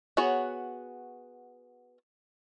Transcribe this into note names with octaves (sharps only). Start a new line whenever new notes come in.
B3 F#4 G#4 C#5